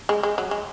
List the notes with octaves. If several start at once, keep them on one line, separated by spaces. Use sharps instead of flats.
G#3
G#3
F#3
G#3